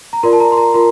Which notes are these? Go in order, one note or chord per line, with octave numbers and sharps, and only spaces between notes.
A#5
F4 A#4 D5 C6
A5
A#5
C6
A#5
F4 A#4 C6